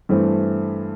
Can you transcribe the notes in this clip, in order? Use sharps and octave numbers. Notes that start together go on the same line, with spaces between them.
G2 E3 A3 C4